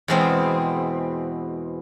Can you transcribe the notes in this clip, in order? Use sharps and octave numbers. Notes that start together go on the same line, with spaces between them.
E2 B2 G#3 C4